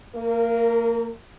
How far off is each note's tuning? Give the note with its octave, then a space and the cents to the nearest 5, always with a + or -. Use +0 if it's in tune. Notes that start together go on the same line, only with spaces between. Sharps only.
A#3 -30 A#4 +0